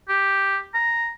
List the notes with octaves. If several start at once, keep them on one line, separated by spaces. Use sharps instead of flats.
G4
A#5